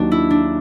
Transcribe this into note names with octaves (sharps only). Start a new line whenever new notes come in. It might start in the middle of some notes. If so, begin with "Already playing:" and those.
Already playing: D#2 D#3 F#3 D4
E4
D4